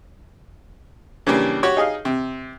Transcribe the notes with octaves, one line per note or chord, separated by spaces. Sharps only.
C#3 E3 G3 A#3 D4
F#4 G4 C#5 C#6
D#4 G#4 D#5 F5
C3